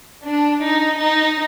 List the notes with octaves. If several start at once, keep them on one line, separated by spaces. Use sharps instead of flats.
D4
D#4
D#4